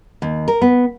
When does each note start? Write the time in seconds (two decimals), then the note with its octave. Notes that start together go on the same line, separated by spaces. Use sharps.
0.22 D#2
0.48 A#4
0.62 B3